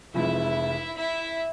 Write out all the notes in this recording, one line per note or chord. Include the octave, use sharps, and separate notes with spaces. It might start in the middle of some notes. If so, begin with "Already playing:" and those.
F1 F2 E3 G#3 E4 E5
E4 E5